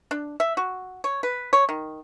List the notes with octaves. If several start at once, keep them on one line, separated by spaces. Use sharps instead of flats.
D4
E5
F#4
C#5
B4
C#5
D#3